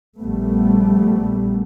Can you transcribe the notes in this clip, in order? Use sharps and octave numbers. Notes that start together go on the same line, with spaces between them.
A#1 A#2 G3 A3 B3